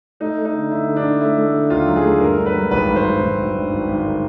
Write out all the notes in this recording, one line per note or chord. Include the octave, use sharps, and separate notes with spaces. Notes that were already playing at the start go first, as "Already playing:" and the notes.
A3 D#4
A3
D#4
D3
D3 E4
D3
D4
D3
A3 E4
A3
D3
D#2 F4
F#3
G#4
A3
G2 A#4
G2
B4
F#3
G#1 B4
G#1
C5
G2
G#1
G#1
G2
G#1
G#1
D3